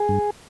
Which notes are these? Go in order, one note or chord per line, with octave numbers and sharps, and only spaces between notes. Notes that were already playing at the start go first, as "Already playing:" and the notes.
Already playing: G#4
G2